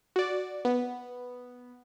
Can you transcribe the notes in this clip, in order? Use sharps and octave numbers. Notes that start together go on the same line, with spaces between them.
F#4 D5
B3